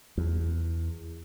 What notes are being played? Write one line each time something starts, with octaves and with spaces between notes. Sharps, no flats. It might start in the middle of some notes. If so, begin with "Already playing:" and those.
E2